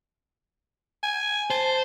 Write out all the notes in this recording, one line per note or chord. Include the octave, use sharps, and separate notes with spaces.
G#5
C5 A5